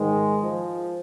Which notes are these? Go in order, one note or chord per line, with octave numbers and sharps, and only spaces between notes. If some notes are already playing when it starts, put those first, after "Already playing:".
Already playing: G#2 D#3 G#3
F3